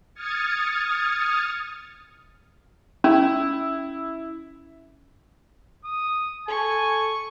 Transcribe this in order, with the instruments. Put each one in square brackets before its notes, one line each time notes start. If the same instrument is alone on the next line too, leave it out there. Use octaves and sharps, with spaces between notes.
[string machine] D#6 F6 G#6 A6 C#7
[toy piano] C#4 [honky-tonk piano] E4
[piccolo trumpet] D#6
[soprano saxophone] A4 [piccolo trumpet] G#5 [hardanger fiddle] C#6